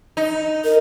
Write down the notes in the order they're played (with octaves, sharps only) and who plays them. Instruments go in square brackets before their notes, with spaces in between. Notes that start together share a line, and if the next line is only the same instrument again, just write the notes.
[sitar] D#4
[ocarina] A#4